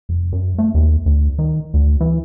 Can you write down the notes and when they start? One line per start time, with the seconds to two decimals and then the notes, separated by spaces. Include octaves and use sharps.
0.09 F1
0.33 F#2
0.58 A3
0.74 D#2
1.06 D2
1.39 D#3
1.74 D2
2.01 E3